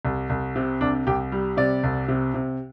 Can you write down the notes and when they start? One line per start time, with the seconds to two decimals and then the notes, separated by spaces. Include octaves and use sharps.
0.05 C2
0.30 C2
0.56 C3
0.81 C2 D4
1.07 C2 G4
1.32 G3
1.57 C3 D5
1.84 C2
2.08 C3
2.34 C3